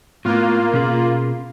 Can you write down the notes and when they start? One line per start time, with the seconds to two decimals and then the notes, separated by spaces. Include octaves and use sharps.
0.25 A2 A#3 B3 F4
0.73 B2 C#4 G#4